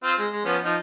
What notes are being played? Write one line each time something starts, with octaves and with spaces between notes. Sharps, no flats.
C4 F4
G#3
G#3
F3 B3 C#4
F3 D#4